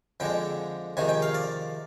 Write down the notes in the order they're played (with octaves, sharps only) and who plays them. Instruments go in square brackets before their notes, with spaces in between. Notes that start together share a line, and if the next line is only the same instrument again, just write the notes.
[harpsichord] F2 D3 G#3 G5
F2 C3 D#3 G#3 G#5
G5
F5
D5